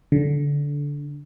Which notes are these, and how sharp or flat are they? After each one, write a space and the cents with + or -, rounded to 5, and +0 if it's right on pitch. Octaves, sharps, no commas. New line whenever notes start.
D3 -20